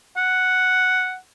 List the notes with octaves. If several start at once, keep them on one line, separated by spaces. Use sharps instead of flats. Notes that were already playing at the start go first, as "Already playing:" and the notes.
F#5